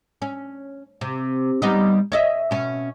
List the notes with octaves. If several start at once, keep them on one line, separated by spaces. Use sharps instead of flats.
C#4
C3
G3 B3 D#4
C#5 D#5 E5
B2 C#4